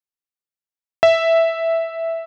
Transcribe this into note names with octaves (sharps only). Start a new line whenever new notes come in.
E5